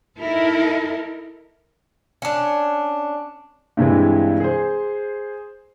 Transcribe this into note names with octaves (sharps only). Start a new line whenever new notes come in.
D#4 E4 A4 A#4
C#4 D4
G2 C3 E3 G#3
G#4 C5